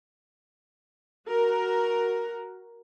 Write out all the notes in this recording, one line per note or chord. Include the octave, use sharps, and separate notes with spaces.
F#4 A#4